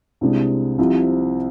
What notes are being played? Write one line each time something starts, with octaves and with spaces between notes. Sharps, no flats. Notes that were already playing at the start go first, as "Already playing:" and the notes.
C2 C3 G#3 D4
C2 C3 F3